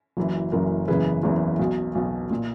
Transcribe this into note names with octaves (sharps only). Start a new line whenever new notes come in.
F#1 F#2 E3
F#1 F#2 E3 A#4
F#1 E2 C#3 E3 G#4 B4
F#1 E2 C#3 E3
B1 B2
B1 B2
A#2